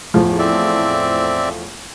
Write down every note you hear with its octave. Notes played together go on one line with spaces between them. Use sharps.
E2 A2 F3
C4 D5 E5